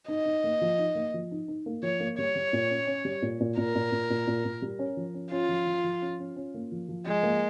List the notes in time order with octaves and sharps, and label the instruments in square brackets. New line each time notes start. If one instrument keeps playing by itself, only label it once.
[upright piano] D#4 [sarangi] D#5
[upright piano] D#4
A#3
F3
D#4
A#3
F3
D#4
D#4
A#3
[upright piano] F3 [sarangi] C#5
[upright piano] A#3
[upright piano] G3 [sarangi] C#5
[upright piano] G3
A#2
C#4
C#4
G3
A#2
A#2
[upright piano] A#2 [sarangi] A#4
[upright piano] A#2
A#2
A#2
A#2
A#2
G3
C#4
F3
C#4
[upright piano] C#4 [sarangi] F4
[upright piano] F3
F3
F3
C#4
C#4
C#4
A#3
F3
F3
[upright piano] F3 [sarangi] G#3
[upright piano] A#3